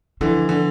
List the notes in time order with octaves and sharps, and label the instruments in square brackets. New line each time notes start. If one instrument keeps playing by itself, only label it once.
[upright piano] D3 E3 [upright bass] F3
[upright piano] D3